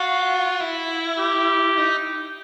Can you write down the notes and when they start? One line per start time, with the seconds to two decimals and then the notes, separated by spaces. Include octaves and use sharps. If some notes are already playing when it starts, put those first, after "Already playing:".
Already playing: F4 F#4
0.60 E4
1.19 G4
1.78 D#4